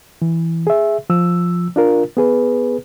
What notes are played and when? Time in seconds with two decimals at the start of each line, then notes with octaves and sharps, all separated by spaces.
0.22 E3
0.67 G#4 E5
1.10 F3 E6
1.76 D4 F4 A#4
2.17 B3 G#4 B4